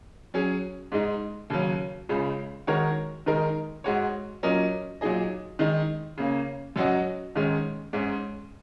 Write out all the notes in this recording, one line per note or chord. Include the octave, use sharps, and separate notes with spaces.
F#3 C#4 G#4
G#2 G#3 D#4
D#2 C#3 F#3 C#4
C#2 C#3 G#3
D#3 G#3 F#4 A#4 C#5
D#3 G#3 D#4 A#4
G#2 G#3 F#4 C#5
A#2 F#3 C#4 A#4 D#5
A#2 F#3 D#4 G#4 D#5
D#3 G#3 D#4
C#3 A#3 C#4
F#2 F#3 C#4 F#4 D#5
G#2 D#3 G#3 C#4
G#2 G#3 C#4